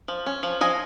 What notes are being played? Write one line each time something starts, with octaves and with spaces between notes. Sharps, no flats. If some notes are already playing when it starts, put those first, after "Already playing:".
F3
C#4
F3
F3 D#5 G#5